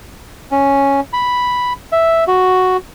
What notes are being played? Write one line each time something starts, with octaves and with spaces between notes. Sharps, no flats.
C#4
B5
E5
F#4